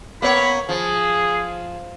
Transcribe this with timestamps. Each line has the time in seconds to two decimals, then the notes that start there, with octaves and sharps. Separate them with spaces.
0.22 A#3 B3 C#5 B5
0.69 F3 G#4